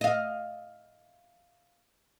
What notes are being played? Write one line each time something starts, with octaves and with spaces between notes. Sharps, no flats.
D#5 F5